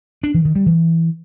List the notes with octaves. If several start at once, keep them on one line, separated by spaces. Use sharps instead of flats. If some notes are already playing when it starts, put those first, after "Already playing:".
D4
E3
D#3
G3
E3